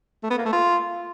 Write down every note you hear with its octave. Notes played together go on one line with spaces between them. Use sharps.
A3
B3
A#3
A3
F4